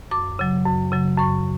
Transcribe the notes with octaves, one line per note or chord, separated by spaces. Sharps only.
F#2 D6
C#3 F#3
F#2
C#3 F#3
F#2 C#6